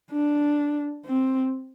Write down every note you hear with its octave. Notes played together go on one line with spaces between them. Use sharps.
D4
C4